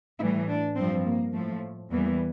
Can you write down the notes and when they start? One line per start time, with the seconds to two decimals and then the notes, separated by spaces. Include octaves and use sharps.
0.19 A2 E3 G3 E4
0.47 D4
0.76 G2 F3 C4
1.05 A#3
1.33 A2 F3 A3
1.91 E2 E3 G3 A#3